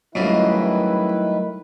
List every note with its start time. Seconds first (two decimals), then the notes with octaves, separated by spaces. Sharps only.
0.15 C#2 G#2 D#3 F#3 G3 A3 E4 B4